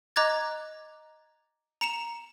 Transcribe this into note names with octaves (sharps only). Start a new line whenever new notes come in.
D#5 A#5 D6 F#6 G#6 A6
A#5 C#7 E7 F7